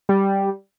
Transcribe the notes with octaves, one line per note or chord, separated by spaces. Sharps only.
G3